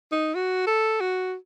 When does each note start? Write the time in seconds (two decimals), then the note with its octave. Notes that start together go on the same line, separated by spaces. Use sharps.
0.12 D#4
0.34 F#4
0.67 A4
1.00 F#4